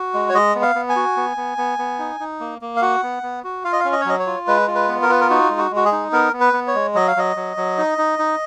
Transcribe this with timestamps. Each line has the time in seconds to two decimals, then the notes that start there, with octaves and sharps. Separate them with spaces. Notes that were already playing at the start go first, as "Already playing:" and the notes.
Already playing: F#4
0.14 G#3
0.29 C#5
0.34 G#3 D#5
0.55 B3
0.62 F5
0.75 B3
0.89 G#5
0.96 F#4
1.17 B3
1.37 B3
1.58 B3
1.79 B3
1.99 D#4
2.20 D#4
2.40 A#3
2.61 A#3
2.76 F5
2.82 F#4 F#5
3.03 B3
3.23 B3
3.44 F#4
3.64 F4 F5
3.73 D#5
3.80 F5
3.85 C#4
3.93 D#5
4.01 C#5
4.05 F#3 D#5
4.19 C#5
4.26 F4
4.47 G#3 B4
4.68 F4
4.75 B4
4.88 B3
5.02 A#4
5.09 F4 B4
5.21 A#4
5.30 D#4 F#4
5.50 G#3
5.58 F#4
5.71 G#3 F#4
5.85 G#4
5.92 D#4
6.13 B3 A#4
6.33 B3
6.40 B4
6.53 B3
6.67 C#5
6.75 G#3
6.94 F#3 D#5
7.08 F5
7.16 F#3 D#5
7.36 F#3
7.57 F#3
7.78 D#4
7.98 D#4
8.19 D#4